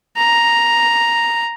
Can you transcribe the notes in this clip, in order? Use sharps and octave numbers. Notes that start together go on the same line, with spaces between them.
A#5